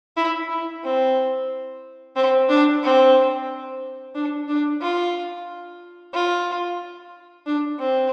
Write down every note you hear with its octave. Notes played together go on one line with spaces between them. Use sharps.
E4
E4
C4
C4
D4
C4
D4
D4
F4
F4
D4
C4